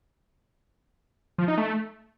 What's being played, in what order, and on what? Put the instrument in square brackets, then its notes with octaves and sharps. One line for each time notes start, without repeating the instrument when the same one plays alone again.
[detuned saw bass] F3
D#4
A3